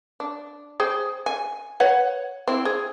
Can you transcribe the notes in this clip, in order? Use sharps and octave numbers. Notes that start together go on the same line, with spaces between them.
D4
G#4 C5 G5
G#5
B4 C#5 F#5
C4 E4
G#4